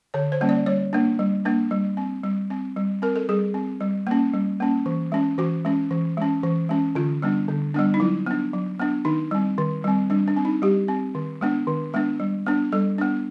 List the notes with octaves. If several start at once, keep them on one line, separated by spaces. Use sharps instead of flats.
D3 C#5
C5
G3 A#3 C#4
D5
G3 C#5
A#3 D4
G3
A#3 D4
G3
C4
G3
C4
G3
C4 A#4
A4
G3 G#4
C4
G3
A#3 C#4
G3
A#3 C#4
E3
G#3 C#4
E3 F#4
G#3 C#4
E3
G#3 C#4
E3
G#3 C#4
D3 F4
G3 B3 D4
D3
G3 B3 D4
D#4
F#3 E4
B3 D4
F#3
B3 D4
D#3 D#4
G3 C4
D#3
G3 C4
G3 D4
D4
C4
D#4
G3 G4
C4
D#3
G#3 B3 D4
D#3
G#3 B3 D4
G3
B3 D4
G3 A4
B3 D4